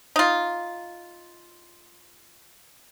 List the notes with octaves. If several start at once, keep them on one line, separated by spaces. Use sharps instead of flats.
D#4 F4